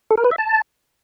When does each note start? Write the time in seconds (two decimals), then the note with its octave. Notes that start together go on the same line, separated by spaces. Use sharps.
0.11 A4
0.17 A#4
0.24 B4
0.31 E5
0.38 A5